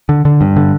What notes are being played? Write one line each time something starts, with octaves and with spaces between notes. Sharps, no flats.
D3
D3
G2
D3